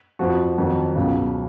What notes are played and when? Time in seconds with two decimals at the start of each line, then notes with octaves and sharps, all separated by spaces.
0.19 F2 F3 F#4
0.58 F2 D#3 F#3
0.96 C#2 B2 F#3